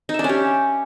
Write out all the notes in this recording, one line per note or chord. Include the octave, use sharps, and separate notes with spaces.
D#4
E5
D4
C#4
G4